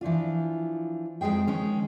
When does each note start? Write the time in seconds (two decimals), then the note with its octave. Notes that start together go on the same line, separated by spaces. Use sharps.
0.01 E3 F3 D4 F4
1.21 F2 D#3 G#3 G#4 G5
1.47 D#3 G#3 C#4